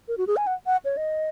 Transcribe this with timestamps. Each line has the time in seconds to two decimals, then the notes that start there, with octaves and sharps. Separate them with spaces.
0.08 A#4
0.18 F#4
0.27 G#4
0.37 G#5
0.47 F#5
0.66 F#5
0.85 C#5
0.97 D#5